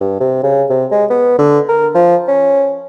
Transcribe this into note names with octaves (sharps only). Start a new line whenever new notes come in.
G2
C3
C#3
C3
G#3
B3
D3
A#4
F3
C#4